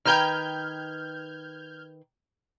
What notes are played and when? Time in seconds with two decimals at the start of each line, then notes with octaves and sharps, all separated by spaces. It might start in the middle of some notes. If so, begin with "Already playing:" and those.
0.05 D#3 B4 G5 F6 G6 G#6